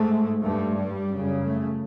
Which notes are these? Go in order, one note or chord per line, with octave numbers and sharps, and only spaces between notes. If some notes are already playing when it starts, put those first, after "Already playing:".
Already playing: G#2 A3
G2 A3
G3
F#2 C#3
A3